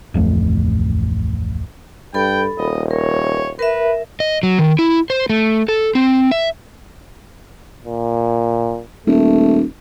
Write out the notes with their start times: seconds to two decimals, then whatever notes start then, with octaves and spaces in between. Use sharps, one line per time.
0.14 D1 A1 F2 A3
2.14 G2 A4 G5 B5
2.58 D#1 D#5
2.91 A#4 C#5
3.59 A#4 B4 E5
4.20 D#5
4.43 F#3
4.59 D#3
4.79 E4
5.10 C5
5.29 A3
5.68 A4
5.95 C4
6.31 E5
7.85 A#2
9.07 D#1 A3